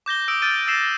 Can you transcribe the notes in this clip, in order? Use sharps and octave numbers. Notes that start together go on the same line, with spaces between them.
D6 G6 A#6 G7
D#6 E6 D7
F6 G6 A6 D7 D#7
E6 A#6 C7 E7